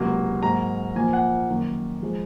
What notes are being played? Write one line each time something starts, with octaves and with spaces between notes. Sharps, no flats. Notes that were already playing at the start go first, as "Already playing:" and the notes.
Already playing: C#2 C3 F#3 A#3
G#2 F#3 A#3 A#5
A#2 F3 A#3 G#5
F#5
F#2 D#3 A#3
F3 G#3